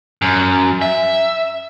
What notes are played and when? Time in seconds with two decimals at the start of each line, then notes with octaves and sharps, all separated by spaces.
0.22 F#2
0.82 E5